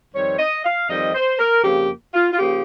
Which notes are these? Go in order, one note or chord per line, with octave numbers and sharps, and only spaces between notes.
F2 D#3 G3 C4 C#5
D#5
F5
F2 D#3 G3 C4 D#5
C5
A#4
F2 C#3 F3 A#3 G4
F4
F4
C#3 F3 A#3 G4